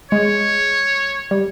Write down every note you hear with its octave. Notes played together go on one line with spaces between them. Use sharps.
G#3 C#5
G3